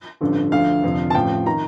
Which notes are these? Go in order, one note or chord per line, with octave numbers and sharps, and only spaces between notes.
A1 G2 D3 F3
D2 D3 F3 F5
F1 F2 D3 F3
A5
A1 A2 F3 G5
D#3 A#5